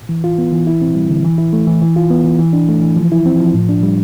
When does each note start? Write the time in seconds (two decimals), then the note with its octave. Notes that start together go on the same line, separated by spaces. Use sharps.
0.09 E3
0.24 F4
0.38 B3
0.52 E3
0.67 E4
0.82 C4
0.95 G3
1.09 D3
1.25 E3
1.38 E4
1.53 A3
1.67 E3
1.81 E3
1.96 F4
2.10 B3
2.24 E3
2.39 E3
2.53 D4
2.69 A3
2.82 E3
2.96 F3
3.12 E4
3.26 C4
3.40 F3
3.54 A2
3.69 D4
3.83 G3